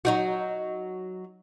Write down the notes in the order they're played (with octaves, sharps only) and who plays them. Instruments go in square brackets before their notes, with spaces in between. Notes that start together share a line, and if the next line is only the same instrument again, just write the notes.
[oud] F#3 D#4 F#4